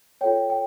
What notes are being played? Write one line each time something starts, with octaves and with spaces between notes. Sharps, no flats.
F4 A4 C#5 G5
G5